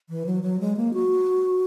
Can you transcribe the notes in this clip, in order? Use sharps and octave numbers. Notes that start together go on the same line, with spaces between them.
E3
F#3
F#3
G#3
A#3
F#4